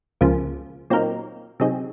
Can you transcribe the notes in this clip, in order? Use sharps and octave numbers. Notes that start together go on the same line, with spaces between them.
C#2 C#3 F3 A#3
A#2 F#3 C4 D#4 A#4
C3 F#3 C4 D#4 G#4